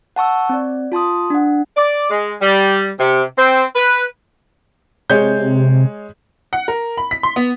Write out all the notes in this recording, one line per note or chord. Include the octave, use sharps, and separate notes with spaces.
F#5 A5 C#6 E6
C4 D5
F4 A5 C6 D#6
D4 F#5
D5
G#3
G3
C3
C4
B4
C3 G#3 C#5 G6
F#5
A#4
B5
B6
C6
B3